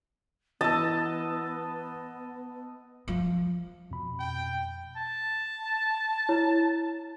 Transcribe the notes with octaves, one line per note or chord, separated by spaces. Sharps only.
E3 B3 D#5 A5 E6
F3
F2 B2 B5
G5
A5
E4 C#5